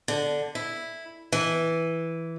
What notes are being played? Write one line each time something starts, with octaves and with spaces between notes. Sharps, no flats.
D3
E4
E3